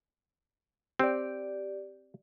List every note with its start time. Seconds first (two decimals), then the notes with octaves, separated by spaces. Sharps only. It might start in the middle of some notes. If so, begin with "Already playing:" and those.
0.99 C4 G4 D5